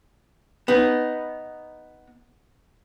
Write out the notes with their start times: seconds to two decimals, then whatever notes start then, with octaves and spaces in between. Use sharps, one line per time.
0.68 B3 D#4